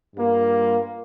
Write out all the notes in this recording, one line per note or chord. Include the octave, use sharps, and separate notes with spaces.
G2 G3 A#3 F4